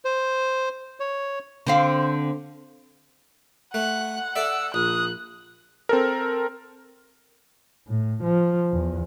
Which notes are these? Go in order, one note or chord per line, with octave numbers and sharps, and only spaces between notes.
C5
C#5
D3 C4 F5
A3 F#5 F#6
A4 D5 E5 E6
A#1 D#6 F#6
C4 A4 A#4
A2
F3
E2